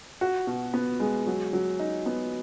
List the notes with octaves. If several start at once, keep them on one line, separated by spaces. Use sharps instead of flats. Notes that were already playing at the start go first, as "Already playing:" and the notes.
F#4
B2
B3
G#3
F#3
F#3
D#4
B3